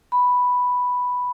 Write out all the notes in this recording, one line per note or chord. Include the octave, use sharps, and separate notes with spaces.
B5